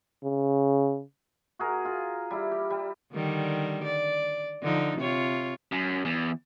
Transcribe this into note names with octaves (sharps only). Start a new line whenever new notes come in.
C#3
F#4 G#4 A#4
F4 G#4
G3 E4
G4
G3
D3 D#3 G3
D5
D3 F3 D#4
C3 F4 C#5
F#2
E2